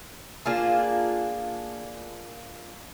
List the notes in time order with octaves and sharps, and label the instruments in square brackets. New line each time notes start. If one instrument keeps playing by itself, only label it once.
[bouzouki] A#3 D4 F4 G#4